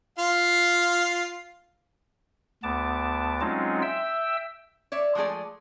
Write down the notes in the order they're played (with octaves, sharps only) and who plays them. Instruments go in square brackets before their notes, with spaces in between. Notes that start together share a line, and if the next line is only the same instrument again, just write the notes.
[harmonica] F4 F5
[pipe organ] D2 B3 A5 D6
F#3 G#3 C4 C#4 D#4 F4
E5 G5 E6
[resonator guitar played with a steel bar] C#5 D5 E5
F3 G#3 A3 G#4 D5